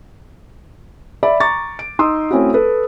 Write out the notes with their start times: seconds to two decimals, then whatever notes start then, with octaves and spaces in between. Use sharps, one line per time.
1.23 D5 E5 B5
1.40 A#5 C#6 D6 A6
1.79 D7
1.99 D#4 C6 D#6 E6
2.31 A3 C4 C#4 E4 F#4
2.54 A4 B4